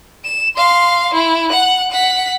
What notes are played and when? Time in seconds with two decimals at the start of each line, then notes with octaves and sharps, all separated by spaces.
0.24 E7
0.56 F5 C6
1.14 E4
1.49 F#5 F#6
1.91 F#5 B6